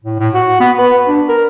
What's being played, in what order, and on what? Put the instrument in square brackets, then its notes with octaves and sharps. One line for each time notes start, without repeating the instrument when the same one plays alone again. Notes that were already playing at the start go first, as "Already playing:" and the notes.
[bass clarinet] A2
A2
F#4
B3
B4
D4
A#4